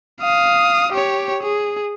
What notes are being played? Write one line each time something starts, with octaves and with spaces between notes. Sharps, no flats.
F5 D#6
G4 C#5
G#4